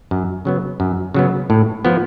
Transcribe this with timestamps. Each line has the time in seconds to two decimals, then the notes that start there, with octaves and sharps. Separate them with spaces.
0.11 F#2
0.45 C#3 F#3 B3
0.80 F#2
1.14 C#3 F#3 B3
1.50 A2
1.85 F3 B3